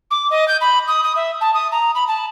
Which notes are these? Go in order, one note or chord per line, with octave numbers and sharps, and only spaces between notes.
D6
D#5
G6
B5
D#6
D#6
E5
A5
D#6
A#5
B5
A5